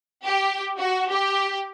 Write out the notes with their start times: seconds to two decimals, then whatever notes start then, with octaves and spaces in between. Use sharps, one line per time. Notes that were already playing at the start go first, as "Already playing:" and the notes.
0.24 G4
0.78 F#4
1.09 G4